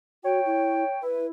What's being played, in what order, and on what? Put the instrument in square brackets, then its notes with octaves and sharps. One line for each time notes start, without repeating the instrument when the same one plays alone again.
[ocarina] F#4 [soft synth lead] C#5 [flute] G5
[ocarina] E4
[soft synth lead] E4 [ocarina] B4